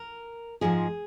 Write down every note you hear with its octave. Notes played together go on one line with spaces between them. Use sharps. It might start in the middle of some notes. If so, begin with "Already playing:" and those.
Already playing: A#4
G#2 F3 G#3 G#4